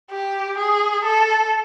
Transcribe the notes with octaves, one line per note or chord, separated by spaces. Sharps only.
G4
G#4
A4